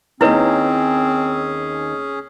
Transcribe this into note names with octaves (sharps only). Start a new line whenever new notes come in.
D#2 C4 C#4 D#4 E4 G#4 B4 C#5